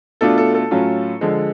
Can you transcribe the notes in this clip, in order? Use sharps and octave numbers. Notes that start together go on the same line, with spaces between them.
B2 A3 D4 F4 A4
A4
A4
A2 F#3 C#4 F4
D3 F3 G#3